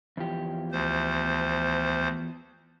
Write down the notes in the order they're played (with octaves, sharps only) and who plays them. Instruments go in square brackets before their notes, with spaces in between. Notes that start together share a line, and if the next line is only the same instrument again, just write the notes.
[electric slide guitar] E2 F3 G4
[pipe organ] D2 C5